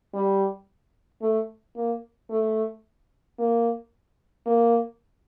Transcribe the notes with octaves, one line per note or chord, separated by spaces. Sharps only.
G3
A3
A#3
A3
A#3
A#3